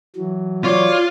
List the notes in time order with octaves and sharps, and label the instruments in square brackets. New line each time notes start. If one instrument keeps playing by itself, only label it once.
[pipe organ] E3 F#3
[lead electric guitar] F4 [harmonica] C#5 D5 C6